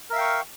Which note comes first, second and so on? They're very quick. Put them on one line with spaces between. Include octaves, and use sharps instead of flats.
A#4 E5 F5 G5 C#6